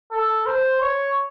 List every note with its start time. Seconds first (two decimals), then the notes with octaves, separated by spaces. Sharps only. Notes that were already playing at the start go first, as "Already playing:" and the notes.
0.12 A4
0.46 C5
0.81 C#5